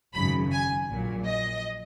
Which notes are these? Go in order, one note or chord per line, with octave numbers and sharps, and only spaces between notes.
G#1 F#2 C#3 B5
G#5
A#1 A#2 F#3
D#5